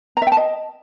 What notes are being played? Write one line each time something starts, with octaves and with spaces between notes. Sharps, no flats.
A#5
E5
G5
A5
D#5